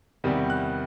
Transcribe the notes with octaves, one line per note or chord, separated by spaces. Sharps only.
E2 C3 D#3 G3
F#6